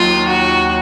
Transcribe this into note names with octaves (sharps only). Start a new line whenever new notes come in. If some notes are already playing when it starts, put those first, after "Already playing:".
Already playing: D#2 D#3 F#3 F4
F#4